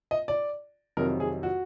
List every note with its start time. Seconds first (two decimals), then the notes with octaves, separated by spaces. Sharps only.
0.11 D#5
0.28 D5
0.97 F2 C3 D#3 F#3 A#4
1.20 G#4
1.43 F#4